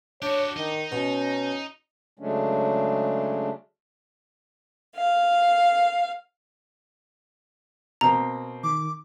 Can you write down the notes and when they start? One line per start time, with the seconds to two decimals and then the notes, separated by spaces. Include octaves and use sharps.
0.22 D4 F#4 G4 C#5
0.57 D#3 D#4
0.92 B2 C#4
2.19 C#3 F#3 G#3 A3 C#4 D4
4.96 F5
8.01 B2 A#3 C4 A#5
8.64 D#3 D6